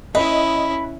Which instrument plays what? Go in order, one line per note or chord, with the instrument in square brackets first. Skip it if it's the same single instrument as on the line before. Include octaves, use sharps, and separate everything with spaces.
[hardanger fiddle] C#4 E4 [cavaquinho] B4 [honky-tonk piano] D#5